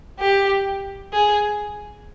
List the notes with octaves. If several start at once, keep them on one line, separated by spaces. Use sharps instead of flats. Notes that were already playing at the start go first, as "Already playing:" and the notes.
G4
G#4